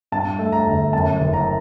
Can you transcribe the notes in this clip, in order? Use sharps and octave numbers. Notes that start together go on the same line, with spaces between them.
G2 A5
A3
A#5
G1
F#2 A5
F#1
A#5